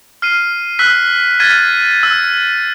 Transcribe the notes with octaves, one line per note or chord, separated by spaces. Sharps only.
F6 C7 D#7
E6 F#6 B6
F6 G#6 A6 B6 D#7
E6